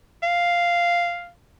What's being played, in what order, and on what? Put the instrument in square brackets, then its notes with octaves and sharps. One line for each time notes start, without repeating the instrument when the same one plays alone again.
[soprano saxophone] F5